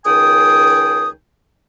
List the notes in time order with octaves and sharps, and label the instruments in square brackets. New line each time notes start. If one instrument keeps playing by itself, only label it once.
[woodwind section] C#2 D#3 G5 G#5 D#6